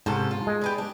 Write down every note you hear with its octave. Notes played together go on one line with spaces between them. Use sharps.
G#2 C3 C#4 A4
F4
G#3
G4 B4 D5
D4